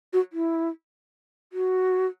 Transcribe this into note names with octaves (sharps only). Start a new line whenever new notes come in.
F#4
E4
F#4